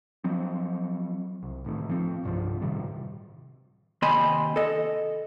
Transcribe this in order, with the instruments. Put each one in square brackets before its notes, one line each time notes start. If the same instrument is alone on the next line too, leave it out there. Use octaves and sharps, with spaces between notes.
[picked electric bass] F3 F#3 C4
C2
A1 A2 D#3
F3 C4
C2 G2 C3 F3
A2 C3 D#3 G3
[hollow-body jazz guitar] D#2 C3 D#5 G#5 B5 C6
A4 D#5